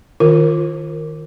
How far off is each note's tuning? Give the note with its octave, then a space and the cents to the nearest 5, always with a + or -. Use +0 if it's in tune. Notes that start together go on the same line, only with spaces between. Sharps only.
D#3 +0 F4 +0 A#4 -10